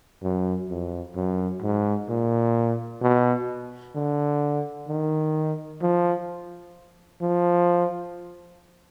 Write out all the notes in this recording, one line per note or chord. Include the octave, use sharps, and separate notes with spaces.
F#2
F2
F#2
G#2
A#2
B2
D3
D#3
F3
F3